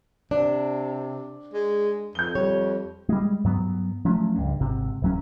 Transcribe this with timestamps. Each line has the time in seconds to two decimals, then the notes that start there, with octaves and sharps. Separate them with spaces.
0.31 C3 D4 D5
1.54 G#3
2.15 F2 G6 G7
2.35 G3 C#5
3.09 G3 G#3
3.44 G2 F#3 B3
4.05 F3 F#3 A3 C#4
4.36 C#2 G2
4.60 G#1 C3
5.02 D1 F#3 C#4